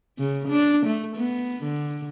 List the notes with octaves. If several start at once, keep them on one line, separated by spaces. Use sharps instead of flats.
C#3
D4
A3
B3
D3